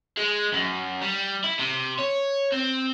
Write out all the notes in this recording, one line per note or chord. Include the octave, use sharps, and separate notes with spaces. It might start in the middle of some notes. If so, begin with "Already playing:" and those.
G#3
F#2
G3
E4
C3
C#5
C4